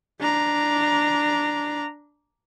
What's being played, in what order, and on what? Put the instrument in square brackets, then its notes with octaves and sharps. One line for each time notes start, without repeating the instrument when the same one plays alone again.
[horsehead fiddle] D4 A#5